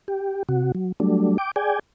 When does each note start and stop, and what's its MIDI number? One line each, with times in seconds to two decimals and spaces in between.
0.08 0.43 67
0.49 0.72 48
0.49 0.72 66
0.75 0.92 54
1.00 1.37 54
1.00 1.37 55
1.00 1.37 57
1.00 1.37 62
1.38 1.51 79
1.38 1.51 86
1.56 1.79 68
1.56 1.79 74
1.56 1.79 79
1.56 1.79 80